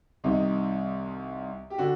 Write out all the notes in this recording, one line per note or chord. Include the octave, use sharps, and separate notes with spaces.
C2 C3 D#3 D#4
G4
D3 F#4